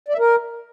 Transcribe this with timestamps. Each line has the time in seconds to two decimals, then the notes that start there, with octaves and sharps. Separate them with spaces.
0.08 D5
0.14 E5
0.19 A#4